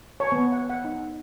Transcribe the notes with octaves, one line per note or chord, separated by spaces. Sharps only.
C#5
B3
F#5
F#5
D#4